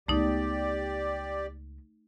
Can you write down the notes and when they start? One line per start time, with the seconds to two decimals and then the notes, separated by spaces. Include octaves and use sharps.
0.08 C#2 A3 B3 D#4 G4 D5